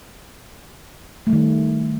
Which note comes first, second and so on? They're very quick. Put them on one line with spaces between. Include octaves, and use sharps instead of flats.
A3 G3 D#3